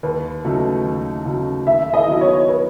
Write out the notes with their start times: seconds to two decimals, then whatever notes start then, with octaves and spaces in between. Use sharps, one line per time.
0.03 D#2 B4
0.45 C#3 F#3 A3 D#4
0.85 D#2
1.25 C#3 F#3 A3 D#4
1.66 D#2 E5
1.94 D#5
2.07 D#3 F#3 B3 E4
2.21 C#5
2.48 B4